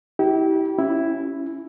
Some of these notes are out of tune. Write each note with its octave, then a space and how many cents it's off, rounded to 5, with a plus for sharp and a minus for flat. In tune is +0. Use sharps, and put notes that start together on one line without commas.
E4 -35 G4 -30
C#4 +0 E4 +0